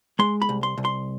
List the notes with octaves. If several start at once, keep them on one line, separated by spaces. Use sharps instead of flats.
G#3 C6
B5
C2
C6
C2
C6